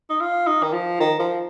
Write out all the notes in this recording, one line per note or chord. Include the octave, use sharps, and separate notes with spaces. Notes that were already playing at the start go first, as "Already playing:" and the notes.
D#4
F4
D#4
D#3
F3
D#3
F3